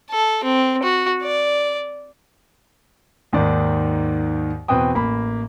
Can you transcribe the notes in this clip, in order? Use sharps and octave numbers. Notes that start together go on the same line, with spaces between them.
A4
C4
F#4
D5
D#2 G#2 D#3 D5
E2 B2 C4 B4 G5 D#6
A1 A#3 B5